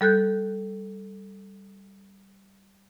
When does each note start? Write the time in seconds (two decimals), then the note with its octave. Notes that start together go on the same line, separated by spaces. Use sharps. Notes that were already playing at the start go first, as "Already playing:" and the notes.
0.01 G3 A4 F#6 G6